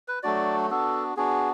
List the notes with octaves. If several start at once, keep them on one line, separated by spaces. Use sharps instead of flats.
B4
F#3 A3 D4 F#4 D5
B3 D4 F#4 A4
B3 D4 F#4 G#4